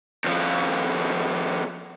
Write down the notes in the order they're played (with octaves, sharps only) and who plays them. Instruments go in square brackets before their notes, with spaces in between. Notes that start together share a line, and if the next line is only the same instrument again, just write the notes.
[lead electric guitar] D#2 F3